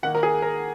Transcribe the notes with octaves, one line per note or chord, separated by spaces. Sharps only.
D#3 A#3 F#5
A#4
G#4
A#4